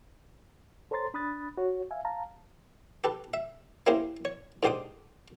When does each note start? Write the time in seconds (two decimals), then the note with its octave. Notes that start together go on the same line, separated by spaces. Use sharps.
0.91 A4 C5 C#5 A#5 C6 A6
1.14 D4 B5 D#6 F#6 A6
1.57 F#4 C#5
1.91 E5 F5 G#5
2.05 F5 A5 A#5
3.04 G4 A4 B4
3.34 E5
3.87 A#3 C#4 E4 G4 G#4 C5
4.25 C#5
4.63 G#2 D3 G4 C5 D6 D#6